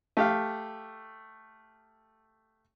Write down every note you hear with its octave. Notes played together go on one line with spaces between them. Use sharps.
A3 G4 F5